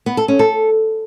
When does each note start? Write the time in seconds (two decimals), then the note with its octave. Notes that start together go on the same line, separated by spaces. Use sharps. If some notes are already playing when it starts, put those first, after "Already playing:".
0.06 B3
0.17 A4
0.28 C#4
0.39 A4